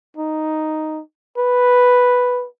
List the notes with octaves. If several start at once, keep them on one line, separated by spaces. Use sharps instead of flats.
D#4
B4